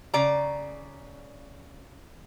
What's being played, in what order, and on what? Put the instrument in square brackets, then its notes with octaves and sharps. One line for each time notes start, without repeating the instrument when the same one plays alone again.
[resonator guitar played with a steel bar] C#3 D5 A#5